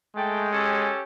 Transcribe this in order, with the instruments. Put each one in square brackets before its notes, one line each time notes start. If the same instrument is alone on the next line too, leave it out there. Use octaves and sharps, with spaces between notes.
[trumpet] G#3 [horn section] A3 G5
[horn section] C#4 G4 A4